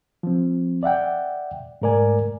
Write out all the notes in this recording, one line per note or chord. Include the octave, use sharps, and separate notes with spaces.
F3 C4
D5 E5 F#5 G5
G#2 A3 A#4 D5 G#5